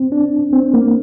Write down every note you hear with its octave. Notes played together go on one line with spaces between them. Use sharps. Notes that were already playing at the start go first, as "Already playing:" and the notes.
Already playing: C4
D4
C4
A#3